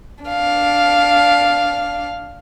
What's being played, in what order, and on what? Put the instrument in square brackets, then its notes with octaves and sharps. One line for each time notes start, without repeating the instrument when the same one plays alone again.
[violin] D4 F5